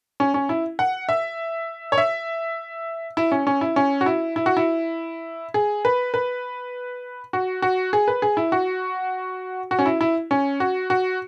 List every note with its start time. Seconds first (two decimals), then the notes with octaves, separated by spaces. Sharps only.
0.20 C#4
0.34 C#4
0.49 E4
0.79 F#5
1.09 E5
1.92 C#5
1.98 E5
3.17 E4
3.32 C#4
3.47 C#4
3.61 E4
3.76 C#4
4.01 F#4
4.06 E4
4.36 E4
4.46 F#4
4.57 E4
5.54 G#4
5.85 B4
6.14 B4
7.33 F#4
7.62 F#4
7.93 G#4
8.08 B4
8.22 G#4
8.37 E4
8.52 F#4
9.71 F#4
9.79 C#4
9.86 E4
10.01 E4
10.31 C#4
10.60 F#4
10.90 F#4